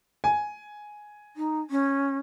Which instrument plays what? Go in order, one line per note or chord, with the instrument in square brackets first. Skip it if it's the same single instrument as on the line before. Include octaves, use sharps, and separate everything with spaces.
[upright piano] G#5
[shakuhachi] D#4
C#4